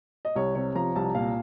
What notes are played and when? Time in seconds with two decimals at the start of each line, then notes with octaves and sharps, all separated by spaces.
0.25 D#5
0.36 C2 C#5
0.55 C3 C#5
0.75 F3 A#5
0.96 C2 A5
1.15 A#2 F5